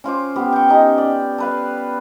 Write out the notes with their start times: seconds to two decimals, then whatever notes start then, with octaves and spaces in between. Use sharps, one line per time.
0.04 C#4 F4 C5 D6
0.36 B3 G4
0.52 G5 C#6
0.69 C#4 D#4 G4
0.98 D5
1.38 A4 B4 F5